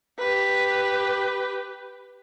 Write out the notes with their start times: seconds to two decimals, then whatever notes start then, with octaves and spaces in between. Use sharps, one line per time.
0.18 G4 B4